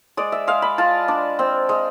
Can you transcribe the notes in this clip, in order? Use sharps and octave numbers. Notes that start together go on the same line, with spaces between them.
G#3 D5
E5
G#3 F5
B5
F4 A5
D4
C4
G#3